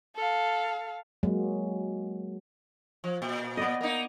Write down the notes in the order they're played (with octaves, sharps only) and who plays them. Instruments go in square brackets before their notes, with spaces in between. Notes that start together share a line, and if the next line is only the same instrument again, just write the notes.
[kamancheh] A4 F5
[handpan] F#3 G#3 A#3
[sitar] F3
A#2
[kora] B3 D5 D#5
[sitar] A#3 D#4